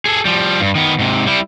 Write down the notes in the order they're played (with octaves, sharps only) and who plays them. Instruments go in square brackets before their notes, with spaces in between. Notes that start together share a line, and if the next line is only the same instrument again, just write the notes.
[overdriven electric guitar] G#4 A4
F3 G3
G2
D#3 B3
G#2 C3
G3 E4